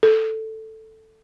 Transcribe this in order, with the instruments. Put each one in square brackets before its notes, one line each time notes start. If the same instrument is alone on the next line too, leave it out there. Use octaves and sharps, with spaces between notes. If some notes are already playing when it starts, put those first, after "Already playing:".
[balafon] A4